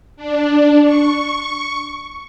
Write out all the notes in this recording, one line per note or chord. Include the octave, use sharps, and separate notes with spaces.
D4
C#6